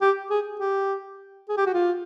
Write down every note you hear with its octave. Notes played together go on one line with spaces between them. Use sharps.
G4
G#4
G4
G#4
G4
F#4
F4